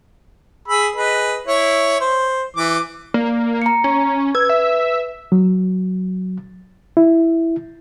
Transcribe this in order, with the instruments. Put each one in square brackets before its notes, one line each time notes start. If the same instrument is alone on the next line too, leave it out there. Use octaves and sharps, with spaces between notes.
[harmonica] G#4 B5 E6
G#4 B4 D#5
E4 C#5
C5
E3 D6
[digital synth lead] A#3 [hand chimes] D5
[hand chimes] A#5 C#7
[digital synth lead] C#4
[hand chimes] B4 E6 [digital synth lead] G#6
[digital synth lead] E5
[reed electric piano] F#3
E4